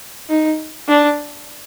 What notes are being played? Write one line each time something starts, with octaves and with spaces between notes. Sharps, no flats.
D#4
D4